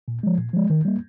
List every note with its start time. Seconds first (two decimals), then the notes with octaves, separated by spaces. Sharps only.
0.08 A#2
0.23 F3 G#3
0.38 A#2
0.54 F3 G#3
0.70 D#3
0.85 G3 A#3